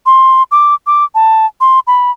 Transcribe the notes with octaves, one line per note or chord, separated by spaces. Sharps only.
C6
D6
D6
A5
C6
B5